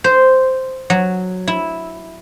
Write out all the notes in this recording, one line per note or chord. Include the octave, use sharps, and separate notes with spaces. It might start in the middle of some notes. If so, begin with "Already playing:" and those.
C5
F#3
E4